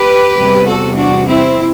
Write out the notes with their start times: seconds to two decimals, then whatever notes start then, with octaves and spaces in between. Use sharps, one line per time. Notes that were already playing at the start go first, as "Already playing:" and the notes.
Already playing: G4 B4
0.35 E2 C3 G3
0.66 F#4 A4
0.97 D4 F#4
1.27 C4 E4